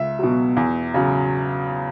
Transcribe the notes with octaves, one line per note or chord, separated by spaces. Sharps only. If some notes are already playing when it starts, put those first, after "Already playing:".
Already playing: C#2 E5
B2 F#3
E2
C#3 F#3